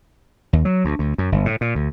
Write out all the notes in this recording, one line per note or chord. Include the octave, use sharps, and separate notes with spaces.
D#2
F#3
D2
D2
F#2
G1
A2
A#2
D2